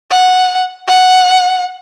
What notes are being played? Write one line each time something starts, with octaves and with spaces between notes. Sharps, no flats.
F#5
F#5